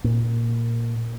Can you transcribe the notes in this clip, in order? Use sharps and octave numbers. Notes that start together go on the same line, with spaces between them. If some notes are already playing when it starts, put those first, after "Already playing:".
A#2